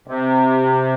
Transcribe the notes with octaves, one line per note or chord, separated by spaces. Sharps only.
C3